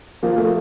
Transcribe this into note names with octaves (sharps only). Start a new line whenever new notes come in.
F3 A#3
A3